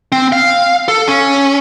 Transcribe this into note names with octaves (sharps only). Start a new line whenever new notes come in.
C4
F5
A4
C#4